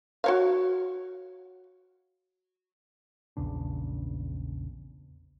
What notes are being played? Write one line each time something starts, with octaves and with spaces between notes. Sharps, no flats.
F#4 C#5 F5
A#1 E2 C#3 D4